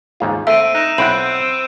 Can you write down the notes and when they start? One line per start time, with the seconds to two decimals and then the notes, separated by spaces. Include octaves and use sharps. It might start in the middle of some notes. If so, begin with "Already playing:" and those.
0.20 D#2 G#2 F4
0.47 A3 C4 E5 E6 D7 D#7
0.74 D#4 F#6 E7
0.98 B1 C4 E4 F#5 B5 G6